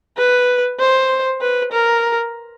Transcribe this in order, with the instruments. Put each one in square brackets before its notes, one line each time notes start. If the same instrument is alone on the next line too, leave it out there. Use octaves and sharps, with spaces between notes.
[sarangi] B4
C5
B4
A#4